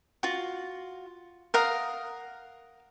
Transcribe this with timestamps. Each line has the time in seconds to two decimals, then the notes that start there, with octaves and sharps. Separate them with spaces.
0.23 F4 F#4
1.54 A#4 F5 F#5 D#6